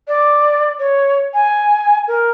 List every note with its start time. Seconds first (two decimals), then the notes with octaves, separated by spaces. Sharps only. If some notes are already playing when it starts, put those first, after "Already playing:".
0.08 D5
0.80 C#5
1.34 G#5
2.08 A#4